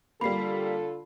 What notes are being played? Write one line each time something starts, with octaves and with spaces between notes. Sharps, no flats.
D3 G3 A#3 F4 A4 B5 C7